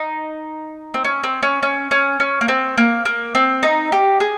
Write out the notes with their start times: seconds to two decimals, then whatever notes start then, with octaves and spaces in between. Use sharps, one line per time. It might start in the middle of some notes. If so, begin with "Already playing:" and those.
Already playing: D#4
0.94 C4
1.04 C#4
1.24 C4
1.43 C#4
1.63 C#4
1.91 C#4
2.20 C#4
2.41 A#3
2.48 C4
2.78 A#3
3.05 A#3
3.35 C4
3.63 D#4
3.92 G4
4.20 G#4